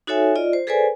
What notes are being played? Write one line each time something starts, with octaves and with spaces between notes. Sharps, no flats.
D#4 F#4 A4 C#5 E5 G#5
F4 D5 D#5
C5
G#4 A4 B4 C5 D5 G#5